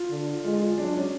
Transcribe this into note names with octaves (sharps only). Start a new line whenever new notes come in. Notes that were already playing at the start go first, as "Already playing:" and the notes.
Already playing: F4
D3
G#3 F4
F4
F#3 D4
C#4